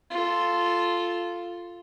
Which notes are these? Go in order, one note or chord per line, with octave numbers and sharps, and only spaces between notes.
F4 A4